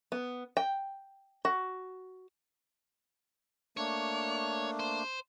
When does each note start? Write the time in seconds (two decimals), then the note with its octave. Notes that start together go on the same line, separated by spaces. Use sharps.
0.12 B3
0.57 G5
1.45 F#4
3.77 A3 A#3 D4 C#5
4.80 C5